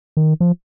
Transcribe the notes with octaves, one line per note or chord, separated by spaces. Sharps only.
D#3
F3